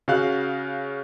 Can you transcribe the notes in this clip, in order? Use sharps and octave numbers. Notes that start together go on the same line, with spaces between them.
C#3 F#4 F5 F#6